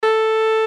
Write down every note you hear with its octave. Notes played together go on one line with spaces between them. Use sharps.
A4